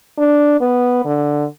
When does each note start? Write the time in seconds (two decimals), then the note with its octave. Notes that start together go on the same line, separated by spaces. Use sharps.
0.18 D4
0.61 B3
1.05 D3